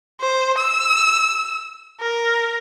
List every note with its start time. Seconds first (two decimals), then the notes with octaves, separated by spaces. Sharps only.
0.21 C5
0.58 E6
2.00 A#4